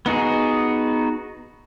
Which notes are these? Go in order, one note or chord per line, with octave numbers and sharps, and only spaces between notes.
B3 D#4 F#4 G#4